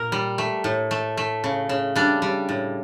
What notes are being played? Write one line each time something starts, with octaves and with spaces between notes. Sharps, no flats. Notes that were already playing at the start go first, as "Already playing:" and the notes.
Already playing: A#2 A#4
G3
A3
A2
A3
A3
C#3
C#3
G3 D4
G3
A2